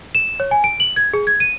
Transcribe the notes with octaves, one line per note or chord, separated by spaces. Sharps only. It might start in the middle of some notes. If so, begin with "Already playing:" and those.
E7
C#5
G#5
D7
F#7
G#6
G#4
G#6
D#7